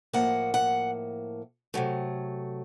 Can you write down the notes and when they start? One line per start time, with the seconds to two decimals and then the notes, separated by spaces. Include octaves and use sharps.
0.13 A2 F3 A#3 F#5
0.54 F#5
1.74 C3 F#3 A3